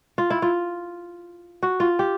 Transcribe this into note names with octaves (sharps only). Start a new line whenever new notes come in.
F4
E4
F4
F#4
F4
G4